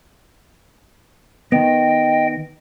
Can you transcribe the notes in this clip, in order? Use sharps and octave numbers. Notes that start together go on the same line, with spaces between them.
D#3 B3 D#5 G5